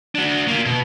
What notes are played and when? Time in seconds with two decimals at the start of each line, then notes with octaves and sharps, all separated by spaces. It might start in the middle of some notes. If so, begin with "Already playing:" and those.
0.15 D4 F#4
0.48 A#3 F4
0.66 B2